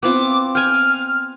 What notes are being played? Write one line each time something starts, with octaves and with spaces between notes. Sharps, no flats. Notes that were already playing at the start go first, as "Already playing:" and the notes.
B3 C4 F4 D6
G5 G#5 F6